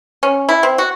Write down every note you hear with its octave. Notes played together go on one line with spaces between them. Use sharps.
C#4
E4
C4
F#4